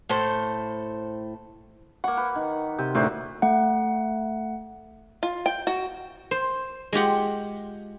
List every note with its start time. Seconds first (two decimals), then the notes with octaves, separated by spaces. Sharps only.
0.09 A2 A4 C5
2.04 A#3 F#5 C#6
2.17 B4
2.36 D#3
2.78 C3 G5
2.94 D2 A2 D4 A#4 C5 F#5
3.42 A3 F#5
5.23 F4
5.46 G5
5.67 F#4
6.31 C5
6.93 G#3 F4 G4 F#5